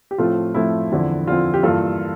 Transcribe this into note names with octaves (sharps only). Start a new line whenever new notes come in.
G4
A2 F3 A3 C4 F4
A2 F3 A3 C4 E4
E2 D3 F3 C4
E2 D3 F3 C4 F4
G4
G2 E3 A#3 F4 A4